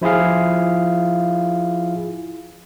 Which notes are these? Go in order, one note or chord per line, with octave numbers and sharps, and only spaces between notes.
F3 E4 F4 G#4 F5